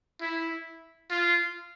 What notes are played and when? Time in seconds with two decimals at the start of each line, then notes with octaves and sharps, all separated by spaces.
0.22 E4
1.10 F4